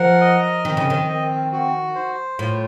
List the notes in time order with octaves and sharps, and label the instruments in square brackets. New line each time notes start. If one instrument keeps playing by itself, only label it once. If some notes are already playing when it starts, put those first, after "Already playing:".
Already playing: [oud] F3 [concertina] A#4 F#5
[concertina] D#5
[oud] D#3 [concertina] C4
[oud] C#3
D#3
[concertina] C4
F#4
C5
[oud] A2 [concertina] F4